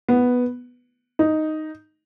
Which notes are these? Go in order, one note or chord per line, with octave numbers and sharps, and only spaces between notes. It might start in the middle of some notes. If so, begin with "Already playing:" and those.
B3
D#4